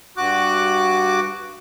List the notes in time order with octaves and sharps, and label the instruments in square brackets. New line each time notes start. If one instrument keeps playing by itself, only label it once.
[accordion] G2 F#4 D6 F#6